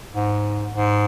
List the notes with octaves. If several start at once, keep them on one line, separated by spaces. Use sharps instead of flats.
G#2
G#2